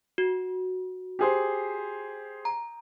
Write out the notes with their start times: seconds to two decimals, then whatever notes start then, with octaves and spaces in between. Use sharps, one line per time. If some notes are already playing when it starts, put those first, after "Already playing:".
0.18 F#4
1.19 G4 G#4 C5
2.45 A#5